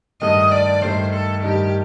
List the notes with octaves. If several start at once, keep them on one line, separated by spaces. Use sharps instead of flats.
G2 D#3 A3 D#4 D#5
D5
G2 D#3 A3 D#4 C5
A4
G2 D#3 A3 D#4 G4